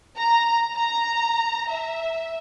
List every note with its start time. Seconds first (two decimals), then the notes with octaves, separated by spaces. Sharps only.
0.17 A#5
0.76 A#5
1.69 E5